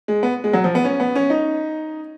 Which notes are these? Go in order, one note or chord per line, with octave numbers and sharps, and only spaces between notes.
G#3
B3
G#3
F#3
F3
B3
C#4
B3
C#4
D#4